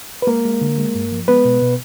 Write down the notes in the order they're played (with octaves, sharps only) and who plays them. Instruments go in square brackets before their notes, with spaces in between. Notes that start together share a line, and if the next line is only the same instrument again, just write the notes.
[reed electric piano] B4
G#3 A#3 A#4
G#3
D3
G#3
G2
F3
G#3 B3 B4
B2
B2